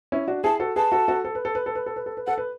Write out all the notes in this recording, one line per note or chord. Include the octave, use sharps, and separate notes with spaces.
C#4 E4
D4 F#4
E4 G#4 A5
F#4 A4
G#4 B4 A5
F#4 A4
F#4 A4
A4
B4
A4
B4
A4
B4
A4
B4
A4
B4
A4 F#5
B4